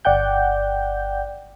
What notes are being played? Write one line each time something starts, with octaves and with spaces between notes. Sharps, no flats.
G1 D5 F#5 G5 G6